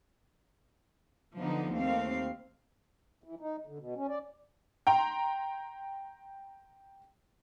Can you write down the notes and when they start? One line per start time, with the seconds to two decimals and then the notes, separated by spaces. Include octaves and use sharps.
1.37 D3 F3 F#3 B3 D#4
1.73 D#2 A3 C4 F5
3.24 E3
3.40 D#4
3.67 D3
3.79 B2
3.96 C#4
4.08 D5
4.87 G5 A#5 C6